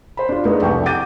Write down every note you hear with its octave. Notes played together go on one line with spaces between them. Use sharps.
C5 B5
D4 F4
G#3 A3 B3 D4 D#4
F1 C2 G4 G5 C#6
F#5 D6 G6 A6 D#7